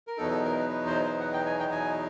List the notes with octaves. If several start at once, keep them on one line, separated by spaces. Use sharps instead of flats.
A#4
E2 B2 F#3 B3 D#4 A4
A4
A#4
B4
B4
C5
C5
F#5
G5
G#5
G5
G#5